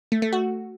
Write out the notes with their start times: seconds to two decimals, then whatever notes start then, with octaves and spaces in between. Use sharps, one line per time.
0.12 A3
0.22 A3
0.33 F#4